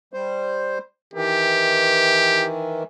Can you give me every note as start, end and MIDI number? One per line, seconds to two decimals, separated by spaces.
0.13 0.78 55
0.13 0.78 72
1.14 2.83 51
1.14 2.83 52
1.14 2.46 67